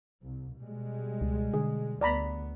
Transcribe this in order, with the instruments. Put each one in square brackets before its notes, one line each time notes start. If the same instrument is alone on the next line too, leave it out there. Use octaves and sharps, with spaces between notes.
[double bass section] C2
B2 G3 G#3
[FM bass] C#2
[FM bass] D3 [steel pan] G#4
[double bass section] D2 B3 [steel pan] D5 A#5 B5